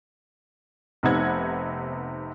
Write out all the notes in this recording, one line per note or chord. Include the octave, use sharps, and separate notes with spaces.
F1 C3 B3 D#4 F#5 G#6